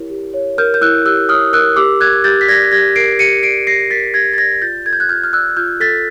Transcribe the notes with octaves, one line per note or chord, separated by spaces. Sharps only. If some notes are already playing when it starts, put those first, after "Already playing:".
Already playing: E4 G4 A#4 C#5
G4
C#5
A#4 F6 G6
G6
E4 E6 F#6
G4 E6 F#6
C#5 D#6 F6
A#4 E6 F#6
G4 D6 E6
A#4 F#6 G#6
G4 G6 A6
B6
D5 G#6 A#6
G4 G#6 A#6
A#4 C7 D7
G4 C#7 D#7
D5 C7 D7
G4 A#6 C7
A#4 A6 B6
G4 G#6 A#6
A6
D5 G#6 A#6
F4 G6 A6
A4 G#6
G6
F#6 G#6
F4 F6 G6
F6
D5 E6 F#6
F4 F6 G6
A4 A6 B6